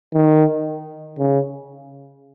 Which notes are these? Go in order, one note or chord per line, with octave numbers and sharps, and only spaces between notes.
D#3
C#3